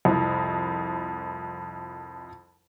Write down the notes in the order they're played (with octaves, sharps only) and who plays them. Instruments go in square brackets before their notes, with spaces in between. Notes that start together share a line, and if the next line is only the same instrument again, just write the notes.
[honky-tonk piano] C2 F2